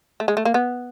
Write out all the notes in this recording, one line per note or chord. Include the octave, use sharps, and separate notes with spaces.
A3
G#3
A3
A#3
B3